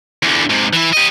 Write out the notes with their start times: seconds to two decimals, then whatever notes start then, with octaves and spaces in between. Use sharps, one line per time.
0.23 E2 D3
0.50 G#2 C3
0.73 E3 E4
0.93 G4 D#5